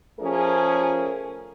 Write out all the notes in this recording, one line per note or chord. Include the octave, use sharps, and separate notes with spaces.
F3 A3 C#4 G#4 A#4